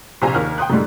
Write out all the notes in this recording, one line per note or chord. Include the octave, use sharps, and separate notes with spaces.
A#1 C3 G4 C5 G#5 A#5
D#2 A#4 F6
G5 C6 D#6 F#6
F#2 A2 D3 G3 G#3